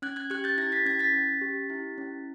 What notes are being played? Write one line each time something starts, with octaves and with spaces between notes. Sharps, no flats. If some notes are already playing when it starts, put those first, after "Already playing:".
C#4 F#6 G#6
F#6 G#6
G4 F#6 G#6
G6 A6
E4 G#6 A#6
A6 B6
C#4 G#6 A#6
A6 B6
C#4
G4
E4
C#4